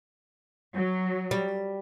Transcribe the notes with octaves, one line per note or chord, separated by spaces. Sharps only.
F#3
G3